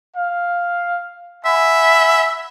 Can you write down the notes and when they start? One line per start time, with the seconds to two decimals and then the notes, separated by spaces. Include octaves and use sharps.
0.15 F5
1.45 E5 F#5 G#5 B5